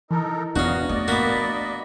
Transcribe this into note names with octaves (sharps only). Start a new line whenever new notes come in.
E3 D#4 A4 A#4
E2 B3 C#4 D4 F#4 D#5 F5
A3 D5 D#5
A#3 F#4 B5 A6 B6